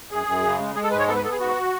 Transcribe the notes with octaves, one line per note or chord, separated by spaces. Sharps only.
F#2 G#4
F#2
C#3
G#3
G#3 G#4
A4
G#2 B4
C#5
B3 A4
B4
B3 A4
G#4
G#2 F#4